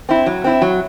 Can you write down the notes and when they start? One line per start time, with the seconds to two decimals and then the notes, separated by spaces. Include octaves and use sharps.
0.09 C4 E4
0.26 F#3
0.44 C4 E4
0.62 F#3